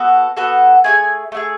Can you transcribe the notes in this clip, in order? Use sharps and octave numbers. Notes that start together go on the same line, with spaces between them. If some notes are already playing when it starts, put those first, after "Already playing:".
Already playing: B3 F#4 A4
B3 F#4 A4
A3 E4 G#4 G#5
A3 E4 G#4